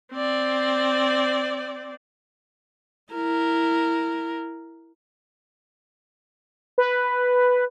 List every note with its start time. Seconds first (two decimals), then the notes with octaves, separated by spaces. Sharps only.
0.13 C4 D5
3.13 E4 A#4
6.78 B4